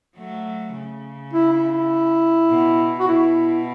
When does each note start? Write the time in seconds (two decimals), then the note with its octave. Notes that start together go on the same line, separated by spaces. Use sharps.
0.16 F#3 A3
0.75 C#3
1.33 E4
1.53 E4
1.72 E4
2.50 B2
2.99 F#4
3.07 B2 E4